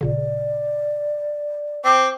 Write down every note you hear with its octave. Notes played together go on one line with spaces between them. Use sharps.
G#1 A#2 C#3 D5
C4 D6